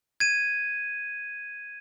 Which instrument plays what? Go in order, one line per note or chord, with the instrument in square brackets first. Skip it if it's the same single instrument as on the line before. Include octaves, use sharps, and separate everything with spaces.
[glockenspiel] G#6 D#7